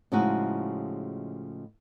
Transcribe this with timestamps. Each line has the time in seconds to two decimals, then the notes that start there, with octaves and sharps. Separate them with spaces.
0.12 A2 C#3 F3 G#3 D#4 F#4